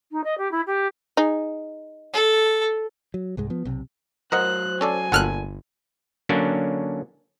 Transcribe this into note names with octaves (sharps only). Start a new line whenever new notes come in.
D#4
D#5
G4
E4
G4
D#4 G#4
A4
F#3
C2 G#2 G#3
F3 B3
B1 C3
F#3 A#4 C5 D#5 F#5 F#6
C#4 A4 D5 G#5
G1 A#2 A4 F#5 F6 F#6
D3 F#3 A#3 C#4 D4